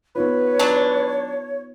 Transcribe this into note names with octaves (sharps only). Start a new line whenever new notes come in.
B3 D#4 F4 B4 C#5
F#3 D4